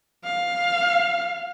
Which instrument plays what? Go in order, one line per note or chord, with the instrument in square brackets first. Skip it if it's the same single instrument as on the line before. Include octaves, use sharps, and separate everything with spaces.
[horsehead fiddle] F5